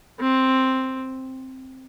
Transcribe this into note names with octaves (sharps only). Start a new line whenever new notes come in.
C4